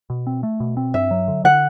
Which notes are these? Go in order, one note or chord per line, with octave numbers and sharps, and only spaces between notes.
B2
C4
A3
B2
C4
G2 E5
F#3
D3
D3 F#5